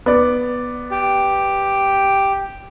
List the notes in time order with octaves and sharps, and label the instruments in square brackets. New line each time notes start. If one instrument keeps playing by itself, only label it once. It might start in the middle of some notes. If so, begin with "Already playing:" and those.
[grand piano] B3 D5
[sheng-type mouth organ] G4